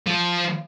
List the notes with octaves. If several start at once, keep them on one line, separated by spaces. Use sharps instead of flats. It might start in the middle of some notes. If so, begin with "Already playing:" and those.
F3